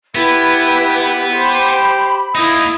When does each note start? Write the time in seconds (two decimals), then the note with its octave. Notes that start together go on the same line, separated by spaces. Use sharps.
0.15 B3 E4 G4 B4
1.35 G4 C5 B5
2.35 A#3 D#4 E4 D#6